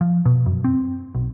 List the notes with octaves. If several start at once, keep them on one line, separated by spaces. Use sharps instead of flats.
F3
B2
F#2
C4
B1